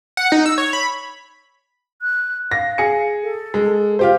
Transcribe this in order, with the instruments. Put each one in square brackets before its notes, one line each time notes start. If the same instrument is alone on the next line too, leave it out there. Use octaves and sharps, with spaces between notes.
[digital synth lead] F#5
D#4
E6
C#5
B5
[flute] F#6
[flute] F5 [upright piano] A#6
[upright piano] G#4 C#7
[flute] A4
[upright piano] G#3
F4 G4 C5